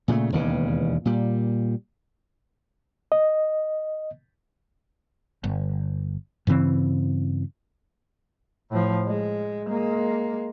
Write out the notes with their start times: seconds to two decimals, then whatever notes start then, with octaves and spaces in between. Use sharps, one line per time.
0.08 A#2 C#3 G#3 A3
0.32 E1 D#2 C#3 E3
1.05 A#2 G3
3.12 D#5
5.44 G1
6.47 G2 C#3 E3 C4
8.70 A2 F3
9.06 G#3
9.68 G#3 A#3